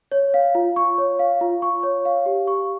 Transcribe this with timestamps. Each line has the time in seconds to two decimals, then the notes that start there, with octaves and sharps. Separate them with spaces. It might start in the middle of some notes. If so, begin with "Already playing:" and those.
0.12 C#5
0.34 F5
0.55 F4
0.76 C#6
0.98 C#5
1.19 F5
1.41 F4
1.62 C#6
1.83 C#5
2.05 F5
2.26 G4
2.47 C#6